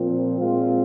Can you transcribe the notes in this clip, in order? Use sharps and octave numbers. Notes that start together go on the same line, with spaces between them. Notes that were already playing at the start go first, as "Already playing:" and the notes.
Already playing: A#2 F3 C4
A#2 G#3 C4 F4